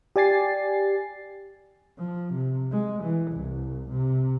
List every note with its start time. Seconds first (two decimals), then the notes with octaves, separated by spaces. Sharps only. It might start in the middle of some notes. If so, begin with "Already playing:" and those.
0.16 G4 D5 G#5 A6 C7
1.98 F3
2.34 C3
2.72 G#3
3.03 E3
3.32 C2
3.91 C3